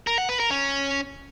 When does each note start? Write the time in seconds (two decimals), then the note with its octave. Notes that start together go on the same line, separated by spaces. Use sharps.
0.07 A#4
0.18 F#5
0.29 B4
0.40 A#4
0.51 C#4